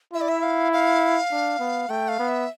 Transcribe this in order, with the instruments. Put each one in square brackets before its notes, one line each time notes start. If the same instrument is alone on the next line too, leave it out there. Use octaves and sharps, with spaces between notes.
[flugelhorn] E4 [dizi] E5
[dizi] D5
E5
F5
F5
[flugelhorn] D4
B3
[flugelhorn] A3 [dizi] G5
[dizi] F5
[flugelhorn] B3
[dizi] E5